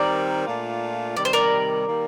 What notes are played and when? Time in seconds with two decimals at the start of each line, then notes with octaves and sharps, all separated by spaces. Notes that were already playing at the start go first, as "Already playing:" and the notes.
Already playing: D#3 G3 C4 A#4 D5
0.45 A#2 A3 D4 F4
1.16 C3 D#3 G3 D5
1.25 C5
1.33 A#4 D5
1.86 D#3 G3 A#3